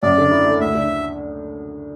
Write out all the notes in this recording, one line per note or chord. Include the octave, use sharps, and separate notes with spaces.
F#2 D5
D3
E4
A3
D2 E5
D3